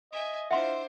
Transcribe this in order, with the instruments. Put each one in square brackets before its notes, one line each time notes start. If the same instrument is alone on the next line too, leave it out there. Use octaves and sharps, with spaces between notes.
[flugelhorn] D#5 [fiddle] E5 G#5
[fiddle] D4 C5 [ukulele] E4 D#5 F#5 [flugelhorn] F4 [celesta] E5 C6